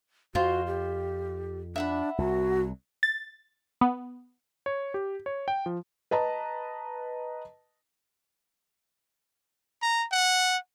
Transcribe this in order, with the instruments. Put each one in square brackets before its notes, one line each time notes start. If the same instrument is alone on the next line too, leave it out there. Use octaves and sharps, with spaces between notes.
[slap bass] F2 [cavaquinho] F4 C5 [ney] F#4
[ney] G4
[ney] D4 [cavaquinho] E5 F#5 B5
[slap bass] C2 [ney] F#4
[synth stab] A6
B3
[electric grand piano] C#5
G4
C#5
G5
F3
[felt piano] B4 D#5 A5 A#5
[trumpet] A#5
F#5